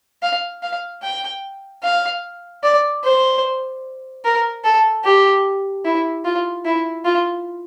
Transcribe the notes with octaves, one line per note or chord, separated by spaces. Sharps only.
F5
F5
G5
F5
D5
C5
A#4
A4
G4
E4
F4
E4
F4